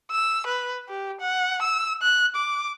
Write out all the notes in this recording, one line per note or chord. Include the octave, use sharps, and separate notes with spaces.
E6
B4
G4
F#5
E6
F#6
D6